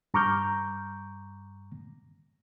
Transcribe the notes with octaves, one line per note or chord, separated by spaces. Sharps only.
G2 A#5 C#6 D6 F6 G6